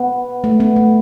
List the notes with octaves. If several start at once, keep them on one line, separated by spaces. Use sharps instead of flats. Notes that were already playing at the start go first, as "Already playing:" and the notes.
Already playing: B3
A3
B3
A3